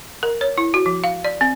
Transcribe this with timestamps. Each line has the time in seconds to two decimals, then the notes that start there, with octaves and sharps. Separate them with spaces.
0.23 A#4
0.41 C#5
0.58 E4
0.74 F#4
0.86 F3
1.04 F5
1.24 D5
1.41 C4